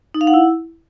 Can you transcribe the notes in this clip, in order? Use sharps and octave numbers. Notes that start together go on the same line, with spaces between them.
D#4
F5
F#5
E4